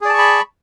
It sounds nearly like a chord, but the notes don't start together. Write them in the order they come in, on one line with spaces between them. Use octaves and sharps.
G#4 D5 A5 C#6 B5